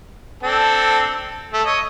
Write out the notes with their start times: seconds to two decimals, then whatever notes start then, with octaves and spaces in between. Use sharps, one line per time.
0.43 C4 D4 A4
1.53 A3
1.65 C#5 D#5